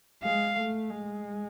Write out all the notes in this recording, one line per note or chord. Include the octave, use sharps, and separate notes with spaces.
G#3 F5
A3
G#3